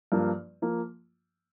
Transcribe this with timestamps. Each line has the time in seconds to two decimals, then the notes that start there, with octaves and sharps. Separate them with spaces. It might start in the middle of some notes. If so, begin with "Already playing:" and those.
0.12 G2 F3 A#3
0.62 F3 A#3